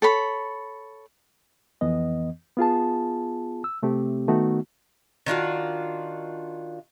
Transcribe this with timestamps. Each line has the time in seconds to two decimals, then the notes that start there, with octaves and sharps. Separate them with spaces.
0.02 A4 C#5 B5
1.81 F2 E3 B3 D#5
2.57 B3 F4 G#4 A5
3.64 E6
3.83 C3 A3 C4 G4
4.28 D#3 A3 B3 D#4 F#4
5.26 D#3 D4 F4 F#4